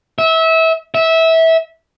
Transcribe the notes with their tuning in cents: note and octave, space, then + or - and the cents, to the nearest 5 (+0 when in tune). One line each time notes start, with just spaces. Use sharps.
E5 -25
E5 -20